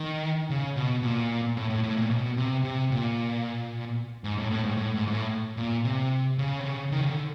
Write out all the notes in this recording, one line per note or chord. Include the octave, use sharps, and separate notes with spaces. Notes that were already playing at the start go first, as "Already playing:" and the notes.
Already playing: D#3
C#3
B2
A#2
A2
A2
A2
A#2
B2
C3
C3
A#2
G#2
A2
A2
G#2
A2
G#2
G#2
A2
A#2
C3
C#3
C3
C#3
D#3
C#3
D3